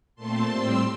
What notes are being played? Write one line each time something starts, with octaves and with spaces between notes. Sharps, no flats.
A#2 A3 C4 A5 C6
A2 G3 C4 C6 E6